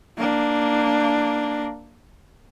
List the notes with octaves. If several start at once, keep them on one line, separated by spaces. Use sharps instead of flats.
A#3 D4